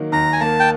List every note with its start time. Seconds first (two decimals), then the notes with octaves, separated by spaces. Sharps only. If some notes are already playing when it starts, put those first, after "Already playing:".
Already playing: D#3 F#3 A#3
0.12 D#2 A#5
0.33 G#5
0.41 A#3 A5
0.60 G5